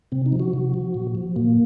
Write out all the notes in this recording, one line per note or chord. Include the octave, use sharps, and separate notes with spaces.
C3 C4
D#4
F3
F#4
C3
F3
A#2
F3
A#2 A#3